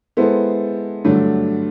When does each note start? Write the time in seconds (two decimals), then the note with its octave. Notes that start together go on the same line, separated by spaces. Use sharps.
0.17 G#3 B3 E4 A4 C5
1.05 G2 D3 F#3 A3 D4